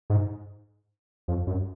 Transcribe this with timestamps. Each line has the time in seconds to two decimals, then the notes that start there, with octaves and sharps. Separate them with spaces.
0.10 G#2
1.28 F2
1.47 F#2